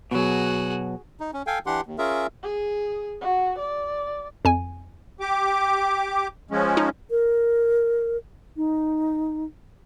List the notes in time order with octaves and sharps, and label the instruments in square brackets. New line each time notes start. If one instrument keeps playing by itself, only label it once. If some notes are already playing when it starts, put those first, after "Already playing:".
[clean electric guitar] B2 F#3 [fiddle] F#4 G#4
[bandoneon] D#4
C#4
A4 F5 G5 G#5
E3 D4 G4 F#5 C6
D#2
C#4 F4 G#4 A#4 E5
[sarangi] G#4
F#4
D5
[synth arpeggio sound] F2 G#5
[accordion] G4 D6
F3 G#3 C#4
[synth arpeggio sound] D#4
[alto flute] A#4
D#4